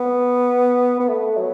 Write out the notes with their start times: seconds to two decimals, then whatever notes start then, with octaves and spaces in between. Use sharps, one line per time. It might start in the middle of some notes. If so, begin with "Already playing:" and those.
Already playing: B3
1.00 B3
1.08 A3
1.37 F#3